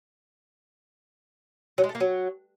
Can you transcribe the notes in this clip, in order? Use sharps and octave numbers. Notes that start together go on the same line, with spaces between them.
F#3
G#3
A3
A#3
F#3